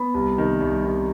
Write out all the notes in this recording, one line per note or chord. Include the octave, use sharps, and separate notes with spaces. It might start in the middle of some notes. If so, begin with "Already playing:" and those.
Already playing: B3
C2
C3 D#3
C2
C3 D#3